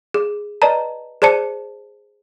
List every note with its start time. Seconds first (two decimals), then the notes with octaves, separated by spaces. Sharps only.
0.14 G#4
0.62 B4 D5 D#5 A5 A#5
1.22 G#4 C5 D5 A5 C#7